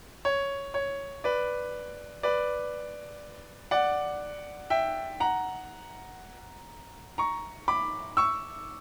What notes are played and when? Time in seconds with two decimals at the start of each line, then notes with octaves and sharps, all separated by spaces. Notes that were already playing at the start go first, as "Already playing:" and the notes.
0.25 C#5
0.74 C#5
1.24 B4 D5
2.23 B4 D5
3.71 D5 F#5
4.70 E5 G5
5.20 F#5 A#5
7.18 A#5 C#6
7.68 B5 D6
8.17 C#6 E6